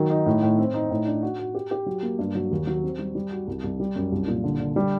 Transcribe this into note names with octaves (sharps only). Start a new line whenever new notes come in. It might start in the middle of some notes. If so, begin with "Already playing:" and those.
Already playing: D#3 F#3
D#4
A2
A2
C4
D#4
A2
D4
F#4
F#4
G4
G4
F#3
A#3
G2
F#3
D#2
F#3
C4
G3
G3
F#4
C2
C2
G3
F#2
C2
A#2
D3
D3
G3